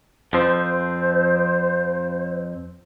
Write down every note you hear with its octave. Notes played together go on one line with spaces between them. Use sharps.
F2 F3 C4 C5